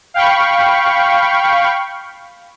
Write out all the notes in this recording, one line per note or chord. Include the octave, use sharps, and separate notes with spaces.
F5 G5 B5 C#6